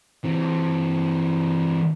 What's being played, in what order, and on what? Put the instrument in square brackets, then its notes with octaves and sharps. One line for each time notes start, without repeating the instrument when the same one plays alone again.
[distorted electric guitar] E3 C4